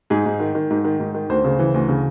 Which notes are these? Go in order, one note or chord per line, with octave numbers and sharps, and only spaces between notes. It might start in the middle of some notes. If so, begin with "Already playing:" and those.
G#2 G#4
G#2
D#3
D#3
G#2
D#3
G#2
D#3
D2 C5
C#3
E3
D2
C#3